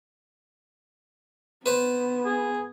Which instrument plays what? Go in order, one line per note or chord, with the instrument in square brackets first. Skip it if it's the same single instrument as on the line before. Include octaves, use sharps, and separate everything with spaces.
[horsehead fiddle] B3 [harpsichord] B4 C5
[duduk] G#4